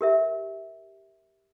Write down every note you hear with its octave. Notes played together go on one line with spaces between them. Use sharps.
G4 A#4 E5